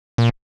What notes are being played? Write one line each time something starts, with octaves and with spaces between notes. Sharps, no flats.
A#2